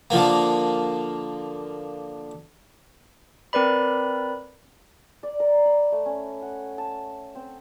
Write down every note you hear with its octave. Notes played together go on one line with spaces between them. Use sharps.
D3 F3 A#3
C4 A#4 B4 D5 B5
D5
A#4
B5
A3
C#4
F#5
A5
C4